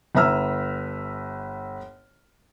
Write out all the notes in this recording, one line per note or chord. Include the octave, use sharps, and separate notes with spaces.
G1 B4 E5 A#5 E6 F6